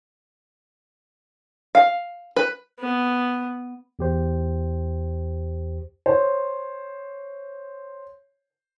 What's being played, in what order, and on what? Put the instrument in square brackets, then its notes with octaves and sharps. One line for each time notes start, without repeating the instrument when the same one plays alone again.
[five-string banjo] F5
B4
[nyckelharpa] B3
[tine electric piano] E2 G4 C5
[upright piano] C5 C#5